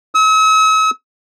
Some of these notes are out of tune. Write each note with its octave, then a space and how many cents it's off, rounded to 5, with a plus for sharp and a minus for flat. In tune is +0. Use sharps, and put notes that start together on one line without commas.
E6 -45